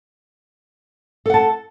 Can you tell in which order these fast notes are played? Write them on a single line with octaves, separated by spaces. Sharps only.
A4 F#5 A5